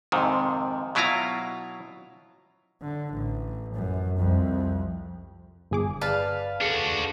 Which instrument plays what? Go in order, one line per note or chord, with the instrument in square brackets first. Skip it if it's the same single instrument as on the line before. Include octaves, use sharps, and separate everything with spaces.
[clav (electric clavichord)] F2 G#2 C3 D#3
B2 F#3 E4 F4 F5 A#5
[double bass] D3
A1
F#2
C2 F2
[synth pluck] G1 G#4 D6
[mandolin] B4 F5 A5 [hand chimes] D5
[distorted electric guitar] D4 F#4 [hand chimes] G#4 A4